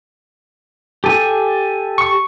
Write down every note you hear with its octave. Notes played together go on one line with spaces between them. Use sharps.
G4 A4 G#5
C#6